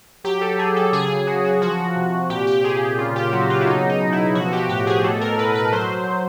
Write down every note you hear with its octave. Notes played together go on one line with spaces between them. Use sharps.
F#3 G4
A4
F#3 G#4
A4
C#3 G#4
C#3 F#4
F#4
F3 F#4
C3
A#2 G4
G4
A#2 G#4
C#3 F4
G4
F#3 F#4
F4
E4
B2 D#4
D#4
B2
E4
F3 F#4
G4
A2 G4
G#4
B2 A4
A#4
B2 B4
B4
F#3 C5
F#3